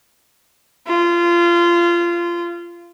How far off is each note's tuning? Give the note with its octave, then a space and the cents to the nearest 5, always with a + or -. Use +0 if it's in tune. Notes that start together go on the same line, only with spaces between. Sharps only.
F4 -20